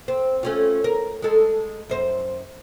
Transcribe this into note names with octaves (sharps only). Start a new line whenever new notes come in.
C4
A3 C#4 F4
A#4
G#3 A4
F#2 C5